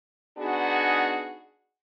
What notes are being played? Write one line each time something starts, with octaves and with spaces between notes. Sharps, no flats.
B3 D4 D#4 F#4 G#4